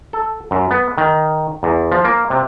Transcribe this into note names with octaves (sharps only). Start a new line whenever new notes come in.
A4
F#2
B3
D#3
E2
F3
A#3
C3